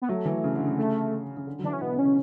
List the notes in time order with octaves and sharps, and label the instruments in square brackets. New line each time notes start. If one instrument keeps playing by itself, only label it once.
[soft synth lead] B3
[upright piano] F#3 [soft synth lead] A3
[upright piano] E3
C#3
D3
C#3
[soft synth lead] A3
[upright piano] C#3
D3
F#3
[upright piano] E3 [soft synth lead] D4
[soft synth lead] C#4
[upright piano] B2 [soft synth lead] B3
[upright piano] C#3
[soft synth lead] C#4
[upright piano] C#3